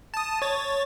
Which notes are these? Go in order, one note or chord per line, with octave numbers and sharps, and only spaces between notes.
A5 D#6
C#5 A6